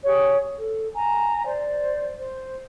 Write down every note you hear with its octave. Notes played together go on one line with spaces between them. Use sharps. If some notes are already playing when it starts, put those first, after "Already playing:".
G4 G#4 C#5
A4
G#5 A#5
C5 D5
C5